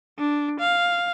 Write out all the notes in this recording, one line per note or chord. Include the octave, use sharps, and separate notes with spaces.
D4
F5